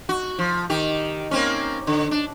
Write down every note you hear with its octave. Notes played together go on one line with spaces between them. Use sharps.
F#4
F3
D#3 G4
A#3 C4 C#4
D3
D4